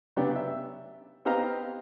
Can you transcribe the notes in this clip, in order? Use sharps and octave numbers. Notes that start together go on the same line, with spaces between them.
C#3 F#3 B3 D4 G4
E5
B3 C4 G4 D#5 F5 A#5